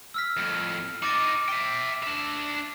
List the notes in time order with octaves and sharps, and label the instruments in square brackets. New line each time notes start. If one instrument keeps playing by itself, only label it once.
[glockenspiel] E6 F6 B6
[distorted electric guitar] F2 A2
[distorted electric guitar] D#4 F#4 [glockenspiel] D6 A6 D7
[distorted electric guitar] E5 G5
D4 E5